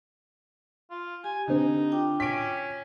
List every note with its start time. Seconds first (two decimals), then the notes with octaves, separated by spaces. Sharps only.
0.90 F4
1.24 G4 G#5
1.48 D3 C4 D#4
1.92 F4 G5 D6
2.20 C#4 B6 D7